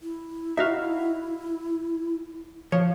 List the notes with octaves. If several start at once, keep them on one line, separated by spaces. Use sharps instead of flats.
E4
D#4 F#4 E5 F5
F3 C#5